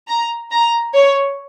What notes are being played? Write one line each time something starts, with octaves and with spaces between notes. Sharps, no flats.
A#5
A#5
C#5